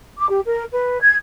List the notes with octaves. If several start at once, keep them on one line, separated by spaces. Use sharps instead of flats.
D6
G4
A#4
B4
G#6